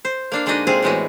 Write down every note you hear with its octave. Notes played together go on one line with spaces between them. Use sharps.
C5
A#3 D4 F5
D3 G#3 D4 D#4 F#4 D#5
C3 G#3 C4 F4 G#4 C5
A2 C3 E3 G#3 B3 F#4